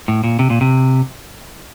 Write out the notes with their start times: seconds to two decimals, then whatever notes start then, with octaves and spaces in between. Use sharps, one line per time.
0.08 A2
0.24 A#2
0.39 C3
0.50 A#2
0.61 C3